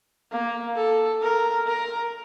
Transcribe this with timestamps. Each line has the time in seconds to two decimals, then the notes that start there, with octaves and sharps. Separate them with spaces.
0.31 A#3
0.76 A4
1.22 A#4
1.67 A#4